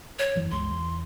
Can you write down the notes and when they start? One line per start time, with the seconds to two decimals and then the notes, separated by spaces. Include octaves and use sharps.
0.19 C#5
0.35 F1 F#2 E3
0.51 G1 C#2 G#3 C6
0.71 E2